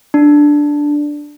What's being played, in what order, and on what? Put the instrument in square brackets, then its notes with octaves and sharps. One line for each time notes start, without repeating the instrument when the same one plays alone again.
[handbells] D4